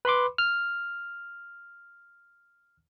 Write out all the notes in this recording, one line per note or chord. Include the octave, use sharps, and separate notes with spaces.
B4 B5 C6 D6
F6